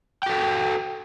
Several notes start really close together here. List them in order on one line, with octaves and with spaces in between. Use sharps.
G5 F#4 A4